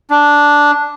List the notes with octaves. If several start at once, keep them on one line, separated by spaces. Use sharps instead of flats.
D4